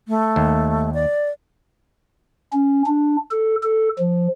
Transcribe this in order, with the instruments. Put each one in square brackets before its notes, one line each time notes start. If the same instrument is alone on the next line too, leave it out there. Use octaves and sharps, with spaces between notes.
[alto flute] A3
[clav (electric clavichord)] D#2
[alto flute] D5
[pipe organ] C#4
D4
A4
A4
F3